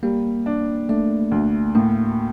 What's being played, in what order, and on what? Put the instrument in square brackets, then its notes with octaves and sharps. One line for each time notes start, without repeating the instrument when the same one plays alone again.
[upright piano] G3 [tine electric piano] A#3
[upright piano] D4
[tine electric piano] A3 [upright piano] D4
[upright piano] D2
[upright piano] A2 [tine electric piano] A#3